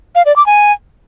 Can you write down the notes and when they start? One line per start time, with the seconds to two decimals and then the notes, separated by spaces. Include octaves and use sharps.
0.15 F5
0.26 D5
0.36 D6
0.46 G#5